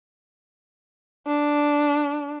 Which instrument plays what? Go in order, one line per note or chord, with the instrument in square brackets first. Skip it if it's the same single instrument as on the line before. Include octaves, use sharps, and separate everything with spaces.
[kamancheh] D4